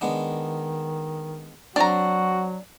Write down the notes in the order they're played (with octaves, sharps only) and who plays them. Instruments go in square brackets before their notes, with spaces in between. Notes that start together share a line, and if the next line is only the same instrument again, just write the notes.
[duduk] D#3 [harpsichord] G#3 B3 D4
[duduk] F#3 [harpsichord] C4 [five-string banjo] D4 A#5 [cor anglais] F#4